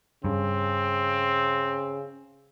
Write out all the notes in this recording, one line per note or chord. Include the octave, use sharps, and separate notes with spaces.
G2 C#3 C4